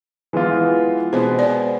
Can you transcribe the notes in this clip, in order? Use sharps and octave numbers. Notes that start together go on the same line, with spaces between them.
E3 G#3 B3 F4
B2 G#3 B3 C5
D5